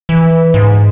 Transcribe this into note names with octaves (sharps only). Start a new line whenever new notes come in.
E3
G#2